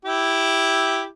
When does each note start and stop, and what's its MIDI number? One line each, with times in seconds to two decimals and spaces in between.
0.05 1.05 64
0.05 1.05 67